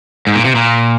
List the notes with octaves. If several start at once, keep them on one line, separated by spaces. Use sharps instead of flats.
G#2
A#2
C3
A#2